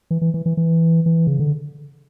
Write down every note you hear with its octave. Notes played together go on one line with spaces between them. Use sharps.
E3
E3
E3
E3
E3
E3
C#3
D3